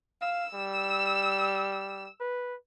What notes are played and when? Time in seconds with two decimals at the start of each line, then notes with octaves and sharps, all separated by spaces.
0.21 F5 E6
0.54 G3
2.20 B4